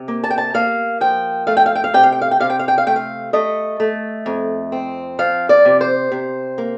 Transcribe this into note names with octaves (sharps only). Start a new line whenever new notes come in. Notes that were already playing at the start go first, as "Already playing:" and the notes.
Already playing: C3
A#3
A5
G5
A5
A#3 F5
F3 G5
A3 F5
G5
F5
G5
F5
C3 G5
F5
G5
F5
G5
C3 F5
G5
F5
G5
F5
A3 G5
F5
A3 D#5
A3
F2
C4
F3 F5
D5
C3
C5
C3
A#3